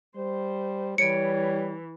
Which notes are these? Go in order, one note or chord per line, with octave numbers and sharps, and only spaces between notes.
G3 C5
E3 G3 C#5 C#7 D7